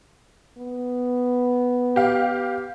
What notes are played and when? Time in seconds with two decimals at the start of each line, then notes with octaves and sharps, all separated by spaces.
0.58 B3
1.96 G4 F5